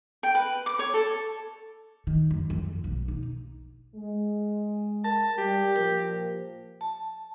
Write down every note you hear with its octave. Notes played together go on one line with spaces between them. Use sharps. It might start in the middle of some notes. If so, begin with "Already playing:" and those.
G5
B4
D6
C#5
A4
D#3
F#2
F2
B1
D#4
G#3
A#4 A5
G3 G4
A#2 F3 A#4
A5